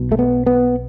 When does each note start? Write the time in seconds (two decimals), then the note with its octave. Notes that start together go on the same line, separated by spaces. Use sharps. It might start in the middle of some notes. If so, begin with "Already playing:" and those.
Already playing: B1 B2
0.12 A3
0.19 B3
0.46 B3